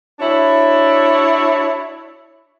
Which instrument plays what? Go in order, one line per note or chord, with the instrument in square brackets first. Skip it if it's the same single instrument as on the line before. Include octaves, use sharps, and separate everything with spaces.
[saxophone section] D4 E4 F#4 C#5